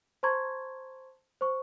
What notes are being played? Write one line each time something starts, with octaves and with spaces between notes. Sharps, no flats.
C5 A5 A#5 C6 C#6 G#6
C5 C#6